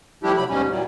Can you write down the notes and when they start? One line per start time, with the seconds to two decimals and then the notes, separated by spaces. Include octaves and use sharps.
0.23 F3 G3 A3 D4 E4 G4
0.37 C3 F#3 B5
0.49 D#2 G#2 B2 G3 C#4
0.69 A#2 E3 F#3 G3